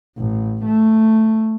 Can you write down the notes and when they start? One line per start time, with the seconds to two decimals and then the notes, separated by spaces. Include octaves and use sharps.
0.17 A1
0.65 A3